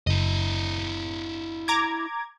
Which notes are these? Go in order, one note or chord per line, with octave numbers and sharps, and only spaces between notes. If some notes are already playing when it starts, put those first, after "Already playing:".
F#1 E4 D#5
A#5 D6 G#6